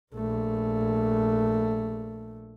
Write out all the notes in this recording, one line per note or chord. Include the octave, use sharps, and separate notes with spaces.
A#1 A3